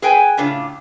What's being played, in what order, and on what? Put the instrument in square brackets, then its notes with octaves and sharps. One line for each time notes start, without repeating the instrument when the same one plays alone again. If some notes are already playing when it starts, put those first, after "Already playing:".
[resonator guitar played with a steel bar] G#4 B4 G5 G#5
A2 C#3 D4 F4